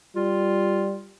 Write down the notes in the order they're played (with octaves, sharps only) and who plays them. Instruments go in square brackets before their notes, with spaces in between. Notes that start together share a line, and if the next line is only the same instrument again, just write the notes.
[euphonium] G3 [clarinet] F4